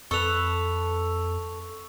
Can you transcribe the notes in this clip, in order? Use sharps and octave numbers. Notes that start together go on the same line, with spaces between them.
F2 A4 B4 C#6 E6 F7